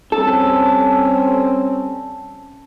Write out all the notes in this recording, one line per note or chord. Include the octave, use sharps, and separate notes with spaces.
G3 C4 C#4 A4